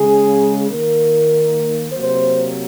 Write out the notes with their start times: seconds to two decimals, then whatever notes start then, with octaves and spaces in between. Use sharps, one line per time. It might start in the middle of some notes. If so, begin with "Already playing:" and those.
Already playing: C#3 G#3 G#4
0.71 D#3 A#3 A#4
1.92 C3 F#3 A#3 C5